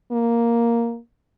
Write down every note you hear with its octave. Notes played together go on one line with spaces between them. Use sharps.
A#3